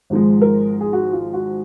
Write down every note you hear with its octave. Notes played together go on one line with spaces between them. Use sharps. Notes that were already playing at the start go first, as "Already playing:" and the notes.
G#1 G#2 F3 G#3
A#4
G#4
F#4
F4
F#4